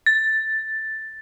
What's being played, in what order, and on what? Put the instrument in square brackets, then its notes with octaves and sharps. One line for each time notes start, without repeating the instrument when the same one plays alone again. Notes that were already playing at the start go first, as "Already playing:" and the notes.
[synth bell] A6